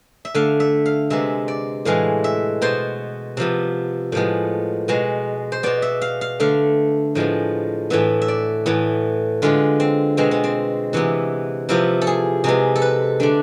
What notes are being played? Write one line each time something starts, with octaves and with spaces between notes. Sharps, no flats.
E5
D3 A3 F5
E5
F5
C3 G#3 B3 E5
D5
A2 E3 G#3 F5
E5
B2 B3 C5
C3 F3 B3
A2 F3 G#3 B3
B2 G#3 B3
C5
B2 B3 D5
E5
F5
F5
D3 A3 F5
A2 F3 G#3 B3
A2 E3 B3 E5
E5
D5
A2 E3 B3
D3 G#3 B3 F4
C4
B2 G#3 B3 C4
B3
C4
C3 E3 B3
C3 F3 B3 E4
A4
G#4
C3 G#3 B3 G#4
A4
B4
D3 A3 D4